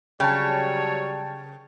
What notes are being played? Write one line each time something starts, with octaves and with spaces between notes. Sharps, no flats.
C#3 F#3 G3 C#5 G5 A5